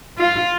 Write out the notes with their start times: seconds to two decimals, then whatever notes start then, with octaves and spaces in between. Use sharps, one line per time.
0.18 F4